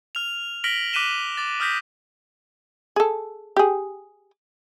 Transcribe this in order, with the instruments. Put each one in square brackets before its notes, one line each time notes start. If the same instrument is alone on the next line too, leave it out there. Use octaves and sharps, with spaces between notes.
[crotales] F6 F7
F6 A#6 B6 D7 F#7 G7
D6 F#6 B6 D#7 E7 G7
D6 A6
D#6 F6 G6 A#6 B6
[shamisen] G#4 A4
G4 G#4